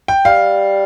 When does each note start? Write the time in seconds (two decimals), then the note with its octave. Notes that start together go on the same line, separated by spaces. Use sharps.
0.08 G5
0.25 G3 F5